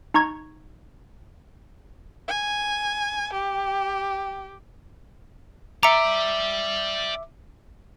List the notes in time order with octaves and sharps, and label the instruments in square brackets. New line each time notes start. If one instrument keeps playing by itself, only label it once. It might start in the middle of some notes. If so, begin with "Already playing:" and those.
[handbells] D#4 A#5 C#6 G#6
[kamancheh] G#5
[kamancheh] G4 [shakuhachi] G5
[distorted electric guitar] D5 G5 [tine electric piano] E5 D6 [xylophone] A#5 C#7